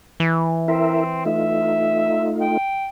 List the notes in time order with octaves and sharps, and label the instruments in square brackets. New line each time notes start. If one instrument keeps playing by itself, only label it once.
[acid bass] E3
[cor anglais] C4 [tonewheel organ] E4 A#4 E5
[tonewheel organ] A3 D#4 F4 [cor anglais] E5
[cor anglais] G5